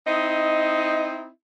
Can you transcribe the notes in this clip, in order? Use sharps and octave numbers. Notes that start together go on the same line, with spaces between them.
C4 D#4 E4 D#5